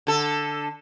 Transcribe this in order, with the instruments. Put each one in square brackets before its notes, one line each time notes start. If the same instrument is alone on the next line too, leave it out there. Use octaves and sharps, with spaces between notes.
[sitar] D3 A4